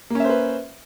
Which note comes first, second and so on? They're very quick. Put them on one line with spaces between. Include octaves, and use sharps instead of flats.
A#3 C#4 E5 C5 B4